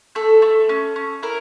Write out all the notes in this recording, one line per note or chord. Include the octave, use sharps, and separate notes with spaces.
A3 A4
A3
C#4
C#4
E4 A#4